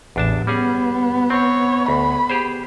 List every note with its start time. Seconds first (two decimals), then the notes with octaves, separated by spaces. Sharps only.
0.16 A1 E2 D4 A5
0.47 G3 B3 C#4 G#4
1.30 C4 C#5
1.88 D2 B5
2.29 G4 G#4 C5